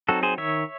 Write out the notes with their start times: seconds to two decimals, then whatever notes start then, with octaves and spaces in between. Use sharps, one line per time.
0.09 F#3 C4 D#4 F#4 A4
0.23 G#4 C5
0.38 D#3 C#5 E5